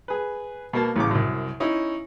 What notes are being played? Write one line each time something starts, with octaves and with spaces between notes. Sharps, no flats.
G#4 B4
B2 A#3 A5
A1 A2 C#3 D6
C2 F#2
C#4 D#4 E4